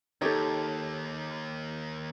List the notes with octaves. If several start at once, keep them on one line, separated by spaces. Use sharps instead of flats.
D#2 D#4 G4 A4 C#5